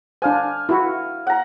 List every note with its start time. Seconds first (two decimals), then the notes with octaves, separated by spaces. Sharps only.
0.22 D4 C5 F5 G#5
0.69 E4 F#4
1.27 F#5 A#5